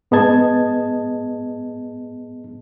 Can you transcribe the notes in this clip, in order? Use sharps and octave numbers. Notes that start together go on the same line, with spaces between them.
G#2 B3 G#4 D#5 A5 G#6